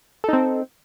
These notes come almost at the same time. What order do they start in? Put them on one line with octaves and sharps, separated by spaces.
A4 D#4 C4